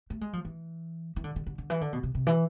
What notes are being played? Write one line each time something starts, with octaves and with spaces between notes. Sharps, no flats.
A3
G#3
F3
E3
E3
D3
D3
D3
D3
E3
D3
B2
C3
C3
E3